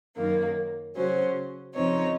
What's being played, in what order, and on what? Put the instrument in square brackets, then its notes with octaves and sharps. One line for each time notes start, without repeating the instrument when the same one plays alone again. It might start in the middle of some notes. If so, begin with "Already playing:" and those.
[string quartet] F#2 D#3 A#3
C#3 F#3 C#4 C5
F2 C#3 F3 C4 D#4 C#5